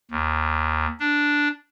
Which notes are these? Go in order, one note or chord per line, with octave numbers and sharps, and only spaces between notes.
D#2
D4